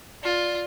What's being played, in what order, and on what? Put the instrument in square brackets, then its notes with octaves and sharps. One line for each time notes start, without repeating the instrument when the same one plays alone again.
[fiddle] F4 [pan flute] D5